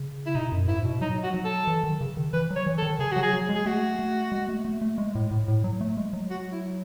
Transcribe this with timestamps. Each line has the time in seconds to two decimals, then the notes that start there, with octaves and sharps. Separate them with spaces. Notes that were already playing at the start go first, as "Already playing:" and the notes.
Already playing: C#3
0.26 E4
0.35 B2 D#4
0.52 F#2
0.68 G#2 E4
0.85 B2
1.01 F#3 D#4
1.23 F#4
1.34 F#3
1.45 A4
1.67 E3
1.84 D#3
2.01 C#3
2.17 D#3
2.33 E3 B4
2.50 F#3
2.56 C#5
2.66 E3
2.78 A4
2.82 D#3
2.99 C#3 G#4
3.12 F#3 F#4
3.22 G#4
3.33 F#3
3.49 G#3
3.55 G#4
3.66 A3 F#4
3.99 A3
4.32 G#3
4.49 A3
4.65 A3
4.81 A3
4.98 G#3
5.15 A2
5.31 A2
5.48 A2
5.64 F#3
5.81 A3
5.97 G#3
6.13 F#3
6.30 F#4
6.52 E4